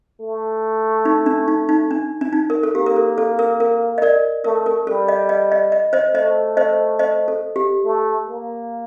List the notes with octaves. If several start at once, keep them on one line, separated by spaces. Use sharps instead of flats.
A3
D#4
D4
D#4
D#4
D4
D4
D#4
A#4
A4
A#3 G4
A#4
A4
A4
A#4
A#4
D#5
A#4 D5
A3 A#4
A#4
G3 A4
D#5
D#5
D#5
D#5
C5 D#5
A3 C5 D#5
C5 D#5
C5 D#5
A4
G4
A3
A#3